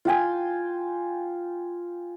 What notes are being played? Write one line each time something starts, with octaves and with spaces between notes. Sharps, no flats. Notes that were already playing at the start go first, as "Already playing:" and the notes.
F4 G5 G#5